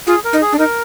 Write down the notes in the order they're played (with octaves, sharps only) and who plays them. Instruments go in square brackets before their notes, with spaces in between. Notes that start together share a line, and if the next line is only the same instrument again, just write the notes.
[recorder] F4 [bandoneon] G#4
[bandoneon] A#4
[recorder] D#4
[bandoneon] G#4
[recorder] D4
[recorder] D#4 [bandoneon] A#4